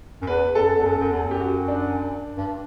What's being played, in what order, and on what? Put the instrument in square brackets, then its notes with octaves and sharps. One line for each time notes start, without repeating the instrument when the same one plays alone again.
[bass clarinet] F#2
[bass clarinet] E2 [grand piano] B4
[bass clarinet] F#2 [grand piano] A4
[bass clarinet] E2
[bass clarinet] F#2 [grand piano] A4
[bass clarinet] F#2
E2
F#2
[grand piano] G4
F#4
D4
[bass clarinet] G2